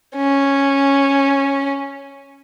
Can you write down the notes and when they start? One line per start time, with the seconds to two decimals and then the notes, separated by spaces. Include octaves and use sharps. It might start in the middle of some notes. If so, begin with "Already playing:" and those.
0.15 C#4